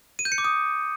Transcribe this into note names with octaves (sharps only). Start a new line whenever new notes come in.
D#7
G6
C#7
D6
D#6